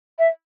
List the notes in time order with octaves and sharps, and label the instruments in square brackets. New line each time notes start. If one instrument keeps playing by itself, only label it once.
[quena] E5